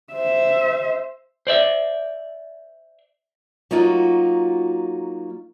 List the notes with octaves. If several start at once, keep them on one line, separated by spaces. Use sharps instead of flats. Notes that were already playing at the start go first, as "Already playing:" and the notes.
C5 E5
C5 D5 E5
F#3 A#3 D#4 F4 F#4